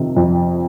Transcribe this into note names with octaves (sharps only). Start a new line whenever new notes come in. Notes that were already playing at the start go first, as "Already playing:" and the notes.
Already playing: F2 C3 D#3
F2